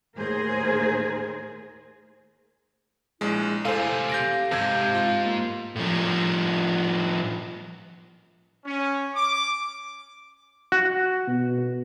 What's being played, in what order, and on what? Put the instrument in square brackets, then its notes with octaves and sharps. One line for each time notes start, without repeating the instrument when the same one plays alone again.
[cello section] D#2 A2 G#4 A#4 C5
[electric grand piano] A#1 G#3 [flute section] E4
[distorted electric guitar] C3 A3 [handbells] A4 G#5 [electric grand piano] C5 F5
[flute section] G4 F5 [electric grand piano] G6 A#6 D7
[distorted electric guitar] E2 G#2 [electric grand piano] C3 [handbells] A5 G6 G#6
[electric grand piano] F4
[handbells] A#3
[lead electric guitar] A2 F3
[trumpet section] C#4
D6
[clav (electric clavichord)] F#4
[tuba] B2